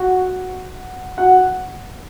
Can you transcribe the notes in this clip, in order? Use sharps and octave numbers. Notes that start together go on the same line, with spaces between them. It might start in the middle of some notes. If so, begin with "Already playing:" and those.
Already playing: F#4 F#5
F#4 F#5